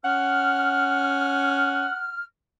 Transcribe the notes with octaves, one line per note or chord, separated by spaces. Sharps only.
C#4 F#5 F6